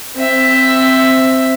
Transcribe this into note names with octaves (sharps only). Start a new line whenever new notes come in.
C4 E5